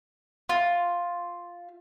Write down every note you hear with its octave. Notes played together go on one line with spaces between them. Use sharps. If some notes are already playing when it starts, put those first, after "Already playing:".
F4